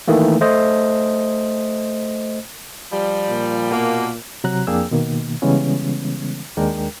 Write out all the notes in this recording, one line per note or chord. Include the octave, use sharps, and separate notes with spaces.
D#3 E3 A3 A#3
A3 C5 D#5
F3 G3
A#2
B2 A#3
C3 F#3 A#5 F#6
F2 A#3 D4 G#4 G5 E6
B2 D#3 A#3
C#3 E3 G3 G#3 B3 C#4
D#2 G#3 D4 A#4 G5